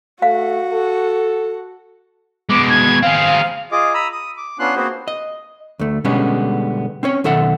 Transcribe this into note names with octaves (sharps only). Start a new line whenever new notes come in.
A3 F#4 F5
A4
B2 G#3 D6
G#6
C4 G#4 F5
F4 G#4 D#5 D6
A#5 B5 D#6 E6
D#6
D6
B3 C#4 D4 F4 C6 F#6
A#3 C4 F#4 G#4 B4 C5
D#5
D2 A3
B2 D3 G3 G#3 B3 C#4
C4 C#4 C#5
B1 D#3 A4 E5 F#5